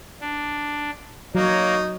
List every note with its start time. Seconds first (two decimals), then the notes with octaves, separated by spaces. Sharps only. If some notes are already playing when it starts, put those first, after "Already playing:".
0.20 D4
1.35 F#3 A#3 D#4 C#5